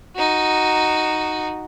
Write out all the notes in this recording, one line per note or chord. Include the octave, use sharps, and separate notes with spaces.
D#4 F#4